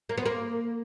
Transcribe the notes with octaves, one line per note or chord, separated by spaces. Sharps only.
A#3
B3
A#3